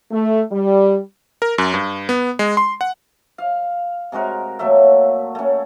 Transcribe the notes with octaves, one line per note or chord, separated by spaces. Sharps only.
A3
G3
A#4
F#2
G2
B3
G#3
C6
F#5
F5
C3 G#3 F#4 A#4
A#2 F#3 A3 E5
A3 C#4